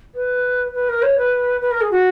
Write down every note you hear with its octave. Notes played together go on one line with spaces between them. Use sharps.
B4
B4
A#4
C#5
B4
B4
A#4
G#4
F#4